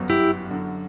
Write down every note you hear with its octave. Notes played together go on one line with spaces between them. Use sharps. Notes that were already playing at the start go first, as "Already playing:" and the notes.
Already playing: G1 F#2 F#3 B3
E4 G4
F#2 D3 F#3